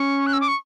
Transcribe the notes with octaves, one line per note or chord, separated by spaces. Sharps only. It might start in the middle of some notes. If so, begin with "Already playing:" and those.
Already playing: C#4 C#6
F#6
E6
D6
C#6